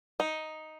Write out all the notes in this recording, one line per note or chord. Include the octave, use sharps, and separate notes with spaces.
D#4